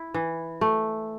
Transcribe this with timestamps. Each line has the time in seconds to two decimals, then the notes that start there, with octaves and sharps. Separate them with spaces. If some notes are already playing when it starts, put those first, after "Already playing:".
Already playing: E4
0.14 E3
0.61 A3